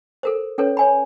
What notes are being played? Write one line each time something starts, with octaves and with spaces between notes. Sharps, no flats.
A4 A#4 C5
C#4 A4 B4 C#5
C#5 G#5 B5